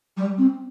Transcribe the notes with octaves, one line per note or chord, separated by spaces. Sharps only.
G3
C4